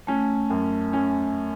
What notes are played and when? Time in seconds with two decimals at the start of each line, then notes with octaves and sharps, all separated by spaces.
0.07 A3 C#4
0.50 F#2
0.93 C#4